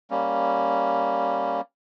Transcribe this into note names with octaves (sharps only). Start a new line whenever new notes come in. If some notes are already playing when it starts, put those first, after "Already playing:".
G3 A#3 C#4